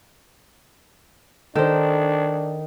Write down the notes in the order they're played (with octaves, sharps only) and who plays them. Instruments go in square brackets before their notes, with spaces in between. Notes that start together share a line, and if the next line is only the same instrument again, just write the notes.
[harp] D#3 [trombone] D4 [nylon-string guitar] A4 C5